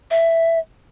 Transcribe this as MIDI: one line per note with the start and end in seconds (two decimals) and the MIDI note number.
0.11 0.59 76